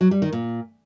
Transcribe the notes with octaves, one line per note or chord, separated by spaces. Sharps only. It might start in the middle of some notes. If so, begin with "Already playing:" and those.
F#3
G3
D#3
A#2